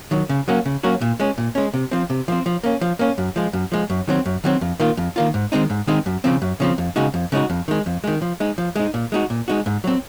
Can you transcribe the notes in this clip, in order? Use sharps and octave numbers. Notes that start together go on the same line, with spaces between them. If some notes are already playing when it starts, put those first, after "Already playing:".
D#3 F#3
C#3
F#3 A#3 C#4 F#4
C#3
F#3 A#3 C#4 F#4
A#2
G#3 C#4
A#2
G#3 C#4
C3
F3 C4
C3
F3 C4
F3
A#3 C#4
F3
A#3 C#4
F#2
F3 G#3
F#2
F3 G#3
F#2
D#3 F#3 C4
F#2
D#3 F#3 C4
F2
D#3 A#3 F4
F2
D#3 A#3 F4
G#2
D#3 G#3 C4 D#4
G#2
D#3 G#3 C4 D#4
F#2
C#3 F3 C4
F#2
C#3 F3 C4
F2
C#3 G#3 D#4 F#4
F2
C#3 G#3 D#4 F#4
F2
D#3 G#3
F2
D#3 G#3
F3
G#3 D#4
F3
G#3 D#4
A#2
G#3 D#4 F#4
A#2
G#3 D#4 F#4
G#2
F#3 C4